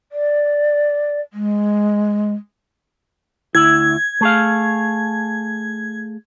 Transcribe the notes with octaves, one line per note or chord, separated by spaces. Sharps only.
D5
G#3
D2 E4 G#6
A3 G#4 F5